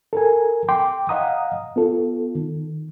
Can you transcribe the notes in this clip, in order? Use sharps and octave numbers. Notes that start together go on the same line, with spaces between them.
A4 A#4 G#5
G5 C6 D6
D#5 F5 F#5 A#5 D#6
B3 F4 A4
D#3